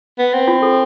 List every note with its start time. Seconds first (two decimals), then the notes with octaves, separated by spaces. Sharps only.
0.19 B3
0.33 C4
0.48 F4
0.62 A4